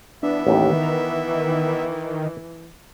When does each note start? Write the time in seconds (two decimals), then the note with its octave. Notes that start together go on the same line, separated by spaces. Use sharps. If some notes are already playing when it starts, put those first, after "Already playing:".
0.23 E3 B3 D4 E5
0.47 A1 D#2 D#3 G4
0.83 A#5